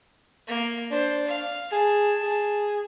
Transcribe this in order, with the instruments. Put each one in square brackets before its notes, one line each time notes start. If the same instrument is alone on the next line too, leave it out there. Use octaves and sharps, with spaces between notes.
[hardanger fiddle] A#3
[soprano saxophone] D4 [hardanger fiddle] C5
[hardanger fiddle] F5
[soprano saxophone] G#4 [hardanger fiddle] A5
[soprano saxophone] G#4